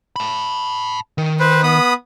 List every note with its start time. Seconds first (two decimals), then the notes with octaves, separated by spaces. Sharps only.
0.16 A5 B5
1.18 D#3
1.40 B4 C5
1.63 B3 B5 D#6